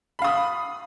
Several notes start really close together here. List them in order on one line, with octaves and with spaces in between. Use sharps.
B5 F5 D#6